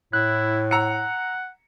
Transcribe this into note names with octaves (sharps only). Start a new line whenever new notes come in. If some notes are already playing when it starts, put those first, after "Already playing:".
A2 E4 F#6
F#5 A#5 E6 C#7